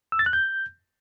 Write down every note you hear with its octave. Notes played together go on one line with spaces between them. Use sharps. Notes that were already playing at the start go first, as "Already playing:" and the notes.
E6
A6
F#6
G6